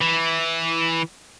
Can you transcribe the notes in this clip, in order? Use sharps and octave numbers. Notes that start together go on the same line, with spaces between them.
E3